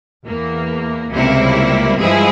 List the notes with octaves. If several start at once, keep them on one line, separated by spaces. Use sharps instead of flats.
E2 E3 A#3
C#2 C3 G3 A#3 E4
G2 F3 G#3 E4 G#4